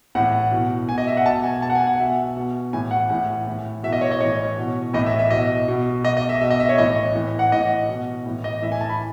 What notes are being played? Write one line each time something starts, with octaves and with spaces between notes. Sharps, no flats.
A2 E3 F#5
B2
B2 G#5
D#5
E5
F#5
B2 A5
G#5
B2 A5
F#5
G#5
F#5
B2 E5
B2
A2 E3 G#5
F#5
A2 E3
A2 E3
B2 E5
D#5
C#5
D#5
A2 E3 C#5
B2
A2 E3 D#5
E5
E5
B2 D#5
B2
B2 D#5
D#5
E5
B2 E5
D#5
E5
C#5
A2 E3 D#5
A2 E3
F#5
A2 E3 D#5
B2
A2 E3
D#5
A2 E3 E5
G#5
A5
B5